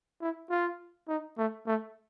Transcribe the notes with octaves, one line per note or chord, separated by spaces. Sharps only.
E4
F4
D#4
A3
A3